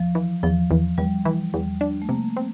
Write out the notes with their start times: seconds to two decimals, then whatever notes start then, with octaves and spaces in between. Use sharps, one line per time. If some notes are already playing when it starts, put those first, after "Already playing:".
Already playing: E2 F3
0.15 E3
0.43 E2 F3
0.71 E2
0.98 E2 G3
1.25 E3
1.54 E2 G3
1.81 D4
2.02 A3
2.09 C3 A#3
2.37 C4